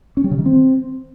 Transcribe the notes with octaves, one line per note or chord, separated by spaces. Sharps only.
C#4
G3
C#3
D#3
C4